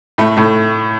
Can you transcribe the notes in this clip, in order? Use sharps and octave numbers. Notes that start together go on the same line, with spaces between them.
A2 A3
A2 A3